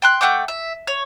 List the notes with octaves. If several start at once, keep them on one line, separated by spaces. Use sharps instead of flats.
G5 C6 F#6
A3 F#5 G5 D6
E5
C#5